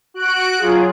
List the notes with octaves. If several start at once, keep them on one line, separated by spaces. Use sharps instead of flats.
F#4 F#6 D7
F#3 F4 G#4